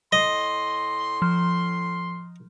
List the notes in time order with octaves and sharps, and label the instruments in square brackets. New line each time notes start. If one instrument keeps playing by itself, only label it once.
[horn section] A2 C6 [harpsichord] D#5
[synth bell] F3